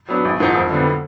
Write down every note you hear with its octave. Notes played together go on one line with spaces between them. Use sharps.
F#3 B3 D4
G#1
G#2 F3 A#3 D#4
F2
D3 G3 B3